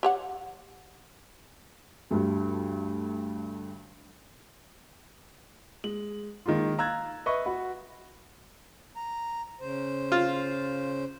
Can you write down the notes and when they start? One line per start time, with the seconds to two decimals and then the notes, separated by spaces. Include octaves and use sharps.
0.03 G4 C#5 F#5
2.11 D2 G2
5.84 G#3 F#7
6.46 D#3 G#3 A#3 F4
6.78 F5 A#5 E6 F#6 G#6 A6
7.26 B4 D#5 E5 C#6
7.45 F#4 B5
8.96 A#5
9.61 C#3 C5
10.12 F4